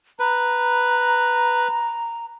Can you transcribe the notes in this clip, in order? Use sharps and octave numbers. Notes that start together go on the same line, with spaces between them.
B4 A#5